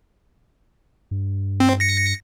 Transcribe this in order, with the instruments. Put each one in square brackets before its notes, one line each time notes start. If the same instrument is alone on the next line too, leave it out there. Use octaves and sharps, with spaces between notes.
[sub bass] G2
[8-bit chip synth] C4
A#6 C#7